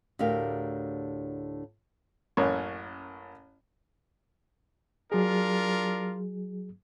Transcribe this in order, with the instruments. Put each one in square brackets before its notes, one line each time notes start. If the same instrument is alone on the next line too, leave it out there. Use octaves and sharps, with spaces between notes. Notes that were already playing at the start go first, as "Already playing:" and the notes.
[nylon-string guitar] D2 A2 D4 G4 A#4 F5
[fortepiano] A1 F#2 A#3 C#5
[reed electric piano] F#3 G#4 [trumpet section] D4 F4 A#4